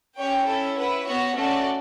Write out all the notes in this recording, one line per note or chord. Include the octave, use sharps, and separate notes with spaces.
C#4 G4 C#5 G5
C#4 E4 A4
E4 B4 F#5
B3 F#4 C#5 F#5
A3 C#4 F#4 A4 D5